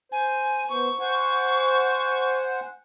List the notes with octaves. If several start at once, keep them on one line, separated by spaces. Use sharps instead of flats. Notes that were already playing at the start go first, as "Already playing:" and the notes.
C5 G#5
B3 C5 C#6
C5 F#5 G#5